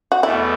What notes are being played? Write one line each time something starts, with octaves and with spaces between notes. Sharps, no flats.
F#4
E2 B2 A3 E4